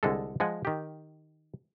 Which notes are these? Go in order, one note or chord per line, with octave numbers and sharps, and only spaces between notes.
C2 D3 G#3 G#4 A4
F3 G#3 F#5 G#5
D#3 G4